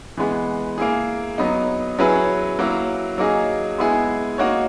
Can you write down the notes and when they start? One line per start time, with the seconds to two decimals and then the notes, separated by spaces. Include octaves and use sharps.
0.17 E3 G#3 B3
0.78 A#3 E4 G#4
1.38 F#3 B3 D#4
1.99 F#3 C#4 E4 G#4 B4
2.59 F#3 A#3 E4
3.18 F#3 A#3 D#4 G#4
3.78 G#3 B3 E4 G#4
4.38 A#3 D#4 F#4 C#5